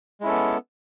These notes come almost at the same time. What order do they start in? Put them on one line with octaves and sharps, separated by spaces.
G#3 E4 C#4 A4 B3